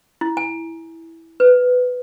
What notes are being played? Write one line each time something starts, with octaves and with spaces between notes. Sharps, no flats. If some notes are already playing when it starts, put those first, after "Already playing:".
E4
G#5
B4